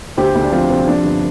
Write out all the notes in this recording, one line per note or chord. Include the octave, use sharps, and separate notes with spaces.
D2 G4 C5
D2
D4
F3 C4 F4
C3 C4
F3 D4
G1